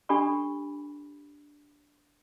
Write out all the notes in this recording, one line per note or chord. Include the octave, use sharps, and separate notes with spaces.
D4 G4 A4 G#5 B5 C#6